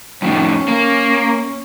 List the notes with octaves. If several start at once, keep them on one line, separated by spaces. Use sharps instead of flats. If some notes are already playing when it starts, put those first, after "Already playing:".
F2 A2 D#3 C#4
A#3